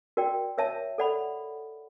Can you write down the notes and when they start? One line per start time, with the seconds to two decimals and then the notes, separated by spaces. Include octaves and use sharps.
0.17 F#4 A#4 D5 G5
0.58 A#4 C#5 E5 A5
0.98 A4 D5 F#5 B5